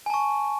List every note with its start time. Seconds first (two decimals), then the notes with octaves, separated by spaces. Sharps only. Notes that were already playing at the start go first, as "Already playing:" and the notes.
0.06 G#5
0.10 A5
0.14 C#6